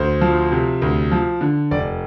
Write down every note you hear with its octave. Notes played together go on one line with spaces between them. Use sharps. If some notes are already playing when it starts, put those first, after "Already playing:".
Already playing: D2 C5
F3
C3
D2
F3
D3
F1 D5